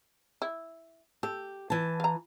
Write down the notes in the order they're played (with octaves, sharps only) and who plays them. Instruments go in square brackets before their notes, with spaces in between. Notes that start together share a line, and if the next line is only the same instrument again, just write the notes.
[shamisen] E4
[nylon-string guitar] G4 [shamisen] A4
[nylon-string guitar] E3 A5
[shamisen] F5 A#5